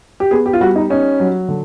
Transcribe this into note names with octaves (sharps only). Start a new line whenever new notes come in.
G4
B3 G#4
G4
F4
G3 F#4
D#4
C#4 D#4
F#3
D3